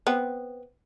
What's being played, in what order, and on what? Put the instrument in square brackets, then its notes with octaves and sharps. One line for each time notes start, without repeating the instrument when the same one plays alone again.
[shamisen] B3 C4